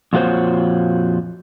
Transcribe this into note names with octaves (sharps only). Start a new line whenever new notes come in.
F2 A#2 F4 F#4 C5 C#5